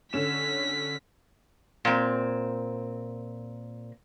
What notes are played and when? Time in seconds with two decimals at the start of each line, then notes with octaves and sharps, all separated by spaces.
0.13 D3 C#4 B6 E7
1.85 A#2 C4